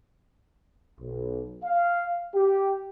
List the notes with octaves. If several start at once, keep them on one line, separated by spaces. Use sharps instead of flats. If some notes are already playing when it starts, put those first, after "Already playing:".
B1
F5
G4